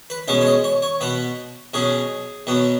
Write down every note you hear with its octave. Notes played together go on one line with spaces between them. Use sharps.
B4
B2 G#3 C#4 C#5
C#5
D#5
C#5
C#5
B2 B3 B4
B2 F#3 C#4 G#4
B2 F#3 B3